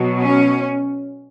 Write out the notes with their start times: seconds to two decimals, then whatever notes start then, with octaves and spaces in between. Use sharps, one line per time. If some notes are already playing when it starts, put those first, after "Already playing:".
Already playing: B2 F#3
0.21 C#4